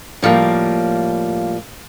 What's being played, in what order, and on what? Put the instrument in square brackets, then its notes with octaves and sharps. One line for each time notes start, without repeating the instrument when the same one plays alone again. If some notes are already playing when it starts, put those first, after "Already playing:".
[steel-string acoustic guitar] A2 F3 G3 A#3